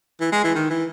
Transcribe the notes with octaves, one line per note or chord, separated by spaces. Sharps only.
E3
G#3
E3
D#3
E3